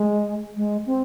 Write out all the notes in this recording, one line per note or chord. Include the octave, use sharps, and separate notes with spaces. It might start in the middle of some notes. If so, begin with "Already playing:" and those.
Already playing: G#3
G#3
C4